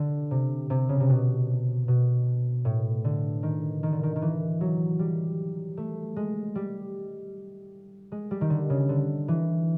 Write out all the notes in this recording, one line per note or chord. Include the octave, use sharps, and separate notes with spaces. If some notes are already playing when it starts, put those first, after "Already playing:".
Already playing: D3
C3
C3
C#3
C3
B2
B2
A2
D3
D#3
D#3
D3
D#3
D#3
E3
F#3
G3
A3
G#3
G3
G#3
G3
D#3
D3
C#3
D3
E3